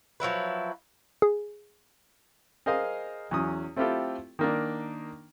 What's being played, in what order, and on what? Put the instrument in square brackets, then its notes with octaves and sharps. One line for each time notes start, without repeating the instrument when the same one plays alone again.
[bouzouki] F3 F#3 E4 B4
[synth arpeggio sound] G#4
[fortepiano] G#4 A#4 C5 D#5 F5 D#6
E2 F#3 C#4 D#6
A3 C4 E4 F4 G4 A4
D#3 A#3 D4